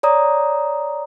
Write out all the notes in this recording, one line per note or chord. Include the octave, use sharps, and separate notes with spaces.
C#5 D5 A#5 D#6